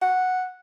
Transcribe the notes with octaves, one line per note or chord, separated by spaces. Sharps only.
F#5